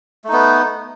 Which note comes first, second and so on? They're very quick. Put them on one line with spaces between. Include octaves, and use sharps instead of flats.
A3 D#4 B3